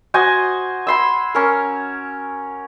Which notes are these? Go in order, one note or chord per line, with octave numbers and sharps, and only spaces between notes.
F#4 C5 D#5 G#5
B5 C6 E6
C#4 A#4